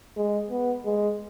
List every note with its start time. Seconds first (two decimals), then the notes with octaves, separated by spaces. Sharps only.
0.17 G#3
0.50 B3
0.85 G#3